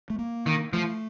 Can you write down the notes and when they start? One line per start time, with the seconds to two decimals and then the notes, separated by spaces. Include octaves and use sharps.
0.10 A3
0.19 A#3
0.46 D#3
0.73 F3 A3